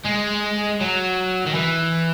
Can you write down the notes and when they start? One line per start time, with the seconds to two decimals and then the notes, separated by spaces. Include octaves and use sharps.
0.05 G#3
0.81 F#3
1.47 D#3
1.55 E3